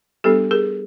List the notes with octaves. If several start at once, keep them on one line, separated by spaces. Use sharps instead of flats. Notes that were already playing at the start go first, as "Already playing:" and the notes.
G3 B3 D4 G4 A4
G#4 A#4